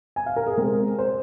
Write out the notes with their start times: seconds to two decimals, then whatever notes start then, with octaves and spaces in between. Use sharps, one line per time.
0.16 G#5
0.26 F5
0.36 A#4
0.46 G#4
0.57 C3 G#3 C4 A#4
0.99 C5